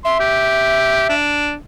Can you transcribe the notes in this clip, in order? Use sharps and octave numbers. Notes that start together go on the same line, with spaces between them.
E5 C6
G4
D4